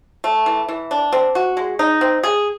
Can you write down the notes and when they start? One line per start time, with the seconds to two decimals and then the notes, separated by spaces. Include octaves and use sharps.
0.24 A3
0.46 E3
0.69 E3
0.91 D4
1.12 C4
1.35 F#4
1.57 G#3
1.79 D#4
2.01 C4
2.23 G#4